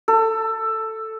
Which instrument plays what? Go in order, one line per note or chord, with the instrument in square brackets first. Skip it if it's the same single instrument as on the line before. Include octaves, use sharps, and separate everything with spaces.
[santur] A4